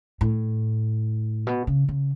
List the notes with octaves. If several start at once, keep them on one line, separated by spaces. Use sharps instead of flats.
A2
B2
C#3
C#3